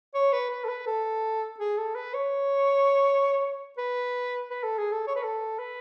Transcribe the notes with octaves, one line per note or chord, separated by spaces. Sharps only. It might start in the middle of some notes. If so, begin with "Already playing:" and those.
C#5
B4
B4
A4
B4
A4
G#4
A4
B4
C#5
B4
B4
A4
G#4
A4
C#5
B4
A4
B4